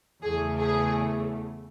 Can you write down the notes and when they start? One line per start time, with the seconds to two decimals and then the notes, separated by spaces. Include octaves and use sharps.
0.22 E2 C#3 E3 A3 G#4
0.58 G#4